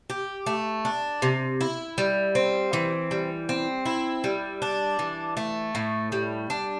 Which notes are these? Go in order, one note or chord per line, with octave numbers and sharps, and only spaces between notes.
G4
A3
D4
C3
E4
G3
C4
E3
G3
C4
E4
G3
D4
E3
A3
A2
G3
D4